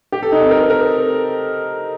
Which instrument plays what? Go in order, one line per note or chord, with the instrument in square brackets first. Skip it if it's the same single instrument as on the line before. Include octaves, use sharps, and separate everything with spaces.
[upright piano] G4
A4
D#4
C4
A#4
A4
A#4